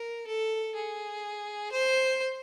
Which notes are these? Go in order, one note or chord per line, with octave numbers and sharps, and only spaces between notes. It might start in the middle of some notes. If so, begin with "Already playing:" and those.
Already playing: A#4
A4
G#4
C5